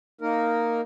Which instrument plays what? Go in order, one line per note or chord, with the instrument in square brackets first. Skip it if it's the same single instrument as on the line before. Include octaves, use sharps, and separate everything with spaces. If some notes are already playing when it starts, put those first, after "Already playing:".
[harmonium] A#3 D#4 A#4